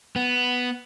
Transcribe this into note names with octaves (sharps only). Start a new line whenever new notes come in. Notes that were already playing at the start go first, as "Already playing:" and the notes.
B3